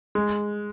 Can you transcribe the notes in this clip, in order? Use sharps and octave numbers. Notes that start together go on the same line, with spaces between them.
G#3